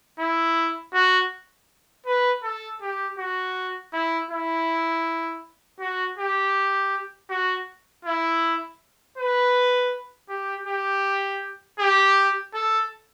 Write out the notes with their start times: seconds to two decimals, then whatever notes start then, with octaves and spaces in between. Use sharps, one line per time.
0.20 E4
0.94 F#4
2.06 B4
2.43 A4
2.82 G4
3.18 F#4
3.93 E4
4.31 E4
5.80 F#4
6.18 G4
7.30 F#4
8.05 E4
9.18 B4
10.30 G4
10.67 G4
11.79 G4
12.54 A4